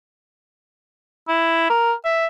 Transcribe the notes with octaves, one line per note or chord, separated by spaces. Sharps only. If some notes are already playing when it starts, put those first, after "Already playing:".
E4
A#4
E5